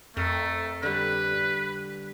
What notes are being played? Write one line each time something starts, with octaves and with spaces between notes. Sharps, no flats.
F2 A3 A#4
D3 G3 B4